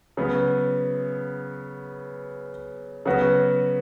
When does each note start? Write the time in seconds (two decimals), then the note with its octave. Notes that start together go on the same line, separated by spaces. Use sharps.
0.17 C#3 F#3 B3
3.06 C#3 F#3 B3 F#4 B4